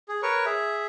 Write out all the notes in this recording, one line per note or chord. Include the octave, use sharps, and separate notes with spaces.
G#4
A#4 B4 C#5 C#6
G#4 E5